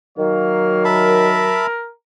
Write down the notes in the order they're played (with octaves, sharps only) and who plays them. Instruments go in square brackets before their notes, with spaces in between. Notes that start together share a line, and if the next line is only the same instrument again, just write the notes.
[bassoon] D#3 [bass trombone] F#3 [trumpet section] A#3 C#5 F5
[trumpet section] A#4 [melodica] E5 A5 B5